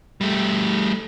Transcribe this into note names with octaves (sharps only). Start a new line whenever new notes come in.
G3 A3